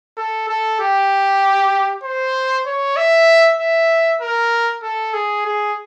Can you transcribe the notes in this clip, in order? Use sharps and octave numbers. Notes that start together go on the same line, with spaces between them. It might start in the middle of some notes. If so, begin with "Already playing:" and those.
A4
A4
G4
C5
C#5
E5
E5
A#4
A4
G#4
G#4